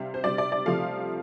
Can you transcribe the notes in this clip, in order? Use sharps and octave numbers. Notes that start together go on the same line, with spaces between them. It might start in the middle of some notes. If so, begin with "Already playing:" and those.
Already playing: C3 G3 F5
C5
C3 G3 D5
D5
D5
C3 F3 A3 F5